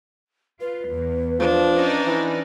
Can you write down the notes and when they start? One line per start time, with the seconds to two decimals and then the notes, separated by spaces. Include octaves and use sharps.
0.61 F4 B4
0.90 E2
1.40 F3 D4
1.75 C#4 D#4 D5
2.07 E3